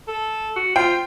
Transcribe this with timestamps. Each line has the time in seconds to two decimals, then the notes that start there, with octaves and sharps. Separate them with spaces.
0.08 A4
0.56 F#4
0.76 F4 C5 G5